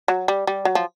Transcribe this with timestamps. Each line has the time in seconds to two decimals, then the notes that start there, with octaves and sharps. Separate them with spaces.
0.08 F#3
0.28 G3
0.47 G3
0.65 F#3
0.75 F3